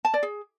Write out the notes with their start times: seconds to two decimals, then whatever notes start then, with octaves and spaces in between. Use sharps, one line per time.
0.05 A5
0.14 D5
0.23 G#4